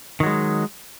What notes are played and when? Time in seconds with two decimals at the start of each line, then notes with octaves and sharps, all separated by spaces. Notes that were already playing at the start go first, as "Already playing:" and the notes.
0.20 D#3
0.23 F#3
0.26 G#3